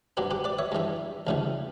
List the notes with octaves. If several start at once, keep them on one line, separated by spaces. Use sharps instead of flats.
G2 F#3 G4 B4
G4 B4
B4 D5
C#5 E5
G2 E3 G3
D2 C#3 E3 G3